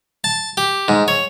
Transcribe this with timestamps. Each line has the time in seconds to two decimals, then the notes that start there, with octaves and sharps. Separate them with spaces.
0.24 A5
0.57 G4
0.88 G#2
1.08 C#5